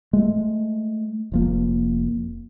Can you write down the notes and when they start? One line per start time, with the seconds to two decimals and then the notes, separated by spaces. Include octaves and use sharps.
0.13 G#3 A3
1.32 F1 F2 A#3